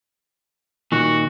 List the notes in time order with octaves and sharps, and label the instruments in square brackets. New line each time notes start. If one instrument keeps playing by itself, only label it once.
[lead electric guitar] A#2 D#3 [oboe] F#4